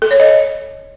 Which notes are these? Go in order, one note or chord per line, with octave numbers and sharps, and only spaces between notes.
A4
C#5
D#5